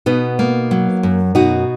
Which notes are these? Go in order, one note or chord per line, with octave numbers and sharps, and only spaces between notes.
B2 B3 D#4
A#3
F#3
F#2
B2 D#4 F#4